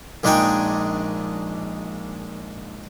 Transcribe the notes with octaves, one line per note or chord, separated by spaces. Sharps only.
A#1 G#3 D4 D#4 G5 G#5